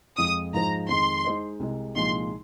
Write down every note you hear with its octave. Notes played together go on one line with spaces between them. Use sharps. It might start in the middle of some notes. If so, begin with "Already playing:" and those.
F2 F3 G#3 D#6
G#2 F3 G#3 D#4 C5 A#5
F2 D#3 G#3 C6
G#3 D#4 C5 D#5
C2 C3 G#3
C2 A#2 F3 G#3 D#4 C6